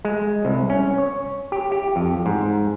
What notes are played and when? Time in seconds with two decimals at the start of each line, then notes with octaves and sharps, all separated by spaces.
0.05 G#3
0.45 C2
0.70 C#4
0.98 C#5
1.52 G4
1.72 G4
1.96 F2
2.26 G#2